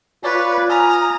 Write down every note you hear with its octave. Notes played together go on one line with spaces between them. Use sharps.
F4 B4 C#5 D5
G#5 A#5 D#6 F6